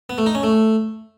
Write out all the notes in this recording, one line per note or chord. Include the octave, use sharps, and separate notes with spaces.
B3
A3
D#4
C#4
A3